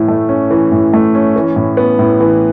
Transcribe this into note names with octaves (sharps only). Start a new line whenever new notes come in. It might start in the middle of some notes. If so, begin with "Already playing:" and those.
Already playing: A2 E3
A3
C#4
E3
A2
A3
C#4
E3
A2
B3
A2
E3